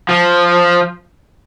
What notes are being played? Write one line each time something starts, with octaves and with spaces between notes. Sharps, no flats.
F3